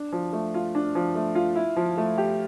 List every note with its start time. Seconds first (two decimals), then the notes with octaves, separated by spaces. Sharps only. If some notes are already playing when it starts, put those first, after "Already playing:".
Already playing: D4
0.12 F3
0.33 A3
0.54 F4
0.75 D4
0.95 F3
1.15 A3
1.35 F4
1.55 E4
1.76 F3
1.97 A3
2.18 G4